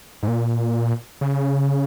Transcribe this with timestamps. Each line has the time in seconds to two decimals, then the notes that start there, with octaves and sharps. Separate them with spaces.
0.23 G#2
0.28 A#2
1.21 C#3